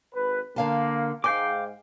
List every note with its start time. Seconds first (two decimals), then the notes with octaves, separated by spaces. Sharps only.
0.14 G#1 B4
0.56 D3 A#3 F5 A5
1.24 G#2 F5 G5 G#5 D6